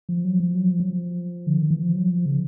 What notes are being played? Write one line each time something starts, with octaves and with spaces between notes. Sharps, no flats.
F3
F#3
F3
F#3
F3
F#3
F3
D3
D#3
E3
F3
F#3
F3
C#3